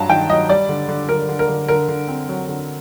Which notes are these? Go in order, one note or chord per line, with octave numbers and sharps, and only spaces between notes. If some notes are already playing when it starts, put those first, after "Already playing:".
Already playing: G2 F#3 A5 A#5
D#3 G5
F#3 D#5
G3 D5
D3
D3
D3 A#4
D3
A#4
D3
D3 A#4
D3
C4
F#3
D3